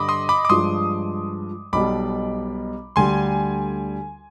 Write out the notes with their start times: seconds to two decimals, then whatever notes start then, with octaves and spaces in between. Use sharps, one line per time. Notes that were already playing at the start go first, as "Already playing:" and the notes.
Already playing: G2 D3 G3 D#5 B5 D6
0.09 C6 D#6
0.29 B5 D6
0.45 D6
0.49 G2 F3 G#3 C6 D#6
1.73 B1 B2 G3 B5 D6
2.96 D2 D3 G3 G#5 C6